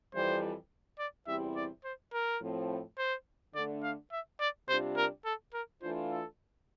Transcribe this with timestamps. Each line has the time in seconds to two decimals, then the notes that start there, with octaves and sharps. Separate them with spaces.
0.14 F2 E3 G3 C5
0.99 D5
1.27 E2 C3 G3 C4 E4 E5
1.56 D5
1.84 C5
2.13 A#4
2.41 A2 F3 C4
2.98 C5
3.55 D3 A3 D4 D5
3.83 F5
4.12 E5
4.40 D5
4.68 C3 G3 D4 F4 C5
4.97 A#4
5.25 A4
5.54 A#4
5.82 E3 A3 D4 F4 C5
6.10 A4